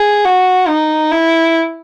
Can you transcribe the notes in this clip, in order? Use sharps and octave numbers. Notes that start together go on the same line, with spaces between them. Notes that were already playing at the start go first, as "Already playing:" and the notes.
Already playing: G#4
F#4
D#4
E4